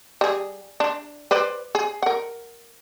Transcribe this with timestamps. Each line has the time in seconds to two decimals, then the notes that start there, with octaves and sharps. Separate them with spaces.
0.21 G3 G#4
0.80 D4
1.31 B4 C5 D5
1.75 G#4
2.02 A#4 F#5